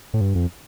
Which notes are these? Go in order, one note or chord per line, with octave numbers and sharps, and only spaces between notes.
A2
G2
F2